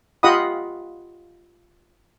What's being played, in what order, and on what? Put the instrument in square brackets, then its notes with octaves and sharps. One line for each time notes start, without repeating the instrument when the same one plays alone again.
[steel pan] F4 G4 D#5 F#5 B5 D#6